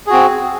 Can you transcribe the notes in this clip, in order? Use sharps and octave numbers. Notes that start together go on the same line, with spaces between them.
C4 F#4 G#4